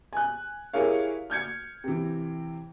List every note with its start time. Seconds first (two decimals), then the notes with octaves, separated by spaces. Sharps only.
0.13 G#5 F#6
0.73 E4 G4 G#4 A#4 C#5 F5
1.30 F6 G6 G#6 C#7
1.84 C3 E3